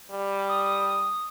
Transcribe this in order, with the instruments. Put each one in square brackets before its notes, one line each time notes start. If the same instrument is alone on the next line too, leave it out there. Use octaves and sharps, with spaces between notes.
[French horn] G3
[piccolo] D#6